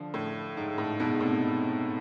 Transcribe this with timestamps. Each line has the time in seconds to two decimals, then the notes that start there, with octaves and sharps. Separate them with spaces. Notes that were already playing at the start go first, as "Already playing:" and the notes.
Already playing: D3 F3
0.14 A2
0.57 G#2
0.78 A2
1.00 G#2 B2
1.21 A2 C3